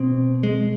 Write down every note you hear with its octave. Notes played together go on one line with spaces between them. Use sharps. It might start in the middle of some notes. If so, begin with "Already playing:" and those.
Already playing: B2 C4
G#3